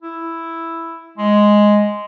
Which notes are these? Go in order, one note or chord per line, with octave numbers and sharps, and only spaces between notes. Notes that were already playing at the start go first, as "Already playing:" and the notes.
E4
G#3